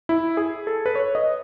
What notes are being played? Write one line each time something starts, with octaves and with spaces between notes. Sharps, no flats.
E4
G#4
A4
B4
C#5
D#5